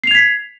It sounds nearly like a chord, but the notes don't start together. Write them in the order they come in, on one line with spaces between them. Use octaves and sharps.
C7 F7 G#6 B6